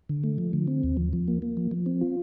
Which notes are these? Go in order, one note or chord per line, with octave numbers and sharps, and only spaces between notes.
D3
A3
F3
D3
C4
D#2
F3
F3
A#3
A#3
F3
F3
C4
F4